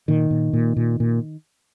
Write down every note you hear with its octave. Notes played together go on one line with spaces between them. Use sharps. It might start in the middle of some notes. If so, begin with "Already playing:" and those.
A#2 D#3
A#2
A#2
A#2
A#2